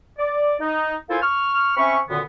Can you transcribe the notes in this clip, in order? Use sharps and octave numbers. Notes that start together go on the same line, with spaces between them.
D5
D#4
A#3 E4 F4 A4 C5 G#5
C#6 F6
C4 C#4 E5 B5 C#6
F#2 A#2 D3 D#3 B3